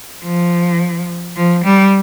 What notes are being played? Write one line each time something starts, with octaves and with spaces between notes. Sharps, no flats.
F3
F3
G3